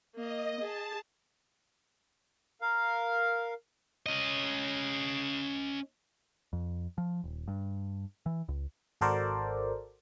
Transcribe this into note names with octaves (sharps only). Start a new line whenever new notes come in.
A#3 D#5
G#4 A5
A#4 F5
C#4 D#5
F2
F3
D#1
G2
E3
C#2
G#1 F#4 A4 A#4 C5 D5